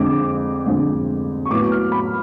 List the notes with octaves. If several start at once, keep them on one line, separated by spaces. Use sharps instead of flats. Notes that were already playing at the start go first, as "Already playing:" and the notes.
Already playing: F2 D3 G#3 D6
F2 D3 G#3
C#6
A2 F#3 B3 D6
F6
B5